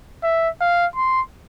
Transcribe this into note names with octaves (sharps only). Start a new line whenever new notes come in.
E5
F5
C6